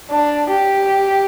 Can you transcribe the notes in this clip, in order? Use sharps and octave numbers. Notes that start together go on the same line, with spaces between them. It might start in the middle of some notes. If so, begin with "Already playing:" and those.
D4
G4